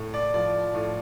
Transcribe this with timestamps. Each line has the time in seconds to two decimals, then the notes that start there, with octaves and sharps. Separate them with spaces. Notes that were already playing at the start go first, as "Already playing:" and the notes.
Already playing: A2
0.14 D5
0.34 F3 D5
0.74 A2